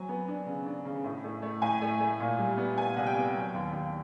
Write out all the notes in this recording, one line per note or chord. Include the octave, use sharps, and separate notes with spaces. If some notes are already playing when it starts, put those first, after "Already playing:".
Already playing: F#3 C4 G#5
B3
D4
C#3
D4
C#3
A2
A3
A3
A2 G#5
A3
A3
A#2
G3
B3
B3 G#5
C2 F#5
G5
B3
F#3
D#2
D#2